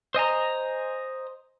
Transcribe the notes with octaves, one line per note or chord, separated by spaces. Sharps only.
C5 D#5 G#5 A#5